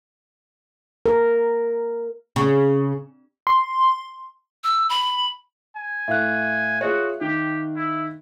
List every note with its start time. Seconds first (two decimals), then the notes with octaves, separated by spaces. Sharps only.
1.06 A#4
2.36 C#3
3.47 C6
4.64 E6
4.90 B5
5.76 G#5
6.08 A2 E5 F5 F#6
6.81 F4 F#4 G#4 C#5
7.21 D#3 G4
7.76 E4